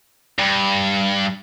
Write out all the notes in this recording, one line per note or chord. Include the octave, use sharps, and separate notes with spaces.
G2